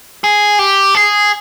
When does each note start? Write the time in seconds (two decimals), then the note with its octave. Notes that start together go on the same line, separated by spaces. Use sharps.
0.24 G#4
0.59 G4
0.95 G#4